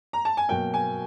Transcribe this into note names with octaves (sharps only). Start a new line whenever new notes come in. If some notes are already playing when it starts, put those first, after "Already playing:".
A#5
A5
G#5
B2 F#3 A#3 G5
G#5